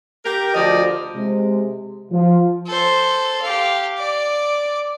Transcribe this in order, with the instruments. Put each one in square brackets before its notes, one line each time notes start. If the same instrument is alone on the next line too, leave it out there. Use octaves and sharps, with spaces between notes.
[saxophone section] G4 A#4
D2 F3 D5 D#5
[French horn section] C3 G#3
[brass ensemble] F3
[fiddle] A4 C5
G4 F5
D5 D6